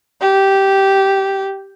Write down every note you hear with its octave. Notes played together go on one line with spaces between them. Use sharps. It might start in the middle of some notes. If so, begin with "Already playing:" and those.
G4